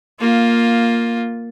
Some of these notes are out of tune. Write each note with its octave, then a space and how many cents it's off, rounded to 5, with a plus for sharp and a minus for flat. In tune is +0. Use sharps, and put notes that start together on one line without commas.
A#3 +0 F4 +10